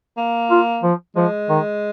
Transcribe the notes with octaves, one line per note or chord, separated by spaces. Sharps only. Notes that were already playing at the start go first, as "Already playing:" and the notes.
A#3
F4
F3
F3 G#3
D#3